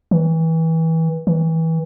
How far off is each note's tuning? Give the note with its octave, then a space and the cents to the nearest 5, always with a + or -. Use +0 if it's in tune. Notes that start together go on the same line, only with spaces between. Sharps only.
E3 -25
E3 -25